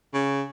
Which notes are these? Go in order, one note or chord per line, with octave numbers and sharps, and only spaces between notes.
C#3